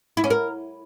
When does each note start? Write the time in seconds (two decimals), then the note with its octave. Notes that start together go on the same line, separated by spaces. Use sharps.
0.17 E4
0.24 C#4
0.30 A#4